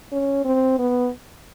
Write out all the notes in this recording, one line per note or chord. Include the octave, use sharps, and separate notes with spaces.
C#4
C4
B3